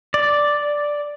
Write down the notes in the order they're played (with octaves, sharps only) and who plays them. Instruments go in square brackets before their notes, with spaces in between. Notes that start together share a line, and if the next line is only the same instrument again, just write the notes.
[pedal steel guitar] D5